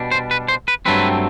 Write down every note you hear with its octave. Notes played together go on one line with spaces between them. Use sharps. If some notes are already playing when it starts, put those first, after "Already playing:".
Already playing: B2 G3 D4
C5
B4
C5
B4
G2 F#3 A3 C4 B4